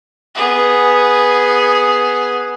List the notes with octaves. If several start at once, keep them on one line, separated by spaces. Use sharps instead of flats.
B3 G#4